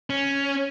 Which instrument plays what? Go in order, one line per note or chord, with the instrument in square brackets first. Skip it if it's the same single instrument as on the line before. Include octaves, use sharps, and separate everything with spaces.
[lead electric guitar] C#4